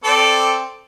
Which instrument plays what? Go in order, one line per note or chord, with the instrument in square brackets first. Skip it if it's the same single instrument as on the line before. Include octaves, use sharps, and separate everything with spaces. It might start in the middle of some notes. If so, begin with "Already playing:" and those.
[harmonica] C4 A4 D5